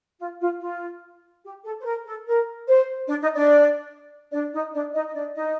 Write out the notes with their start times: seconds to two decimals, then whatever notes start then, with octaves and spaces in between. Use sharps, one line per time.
0.19 F4
0.40 F4
0.60 F4
1.43 G4
1.64 A4
1.79 C5
1.84 A#4
2.05 A4
2.26 A#4
2.67 C5
3.08 D4 D5
3.22 D#4 D#5
3.35 D4 D5
4.31 D4 D5
4.52 D#4 D#5
4.72 D4 D5
4.93 D#4 D#5
5.07 D#5
5.13 D4 D5
5.34 D#4 D#5